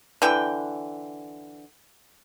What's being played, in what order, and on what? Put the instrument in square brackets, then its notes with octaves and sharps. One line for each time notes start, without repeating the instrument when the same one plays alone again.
[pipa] D3 E3 G5